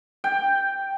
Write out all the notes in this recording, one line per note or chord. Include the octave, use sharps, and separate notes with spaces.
G5